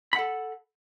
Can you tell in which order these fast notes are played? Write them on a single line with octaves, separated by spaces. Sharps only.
B5 F#5 A4